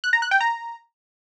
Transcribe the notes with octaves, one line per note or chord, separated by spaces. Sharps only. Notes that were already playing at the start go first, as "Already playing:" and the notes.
F#6
A#5
F#6
G5
A#5